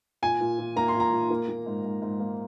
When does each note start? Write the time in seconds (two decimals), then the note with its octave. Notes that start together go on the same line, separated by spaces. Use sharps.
0.22 A#2 G#5
0.41 A#2
0.59 A#2
0.76 A#3 A#5
0.88 C6
0.94 A#2
1.00 A#5
1.12 A#2
1.30 A#3
1.48 A#3
1.66 G#2
1.84 G#2
2.02 G#2
2.20 A#3